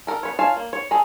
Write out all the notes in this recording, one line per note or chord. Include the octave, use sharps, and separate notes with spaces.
A4 A#4
B3 B4 C#5
F4 C#5 F5 G#5 A5
A#3
C#5
G#4 A4 A#5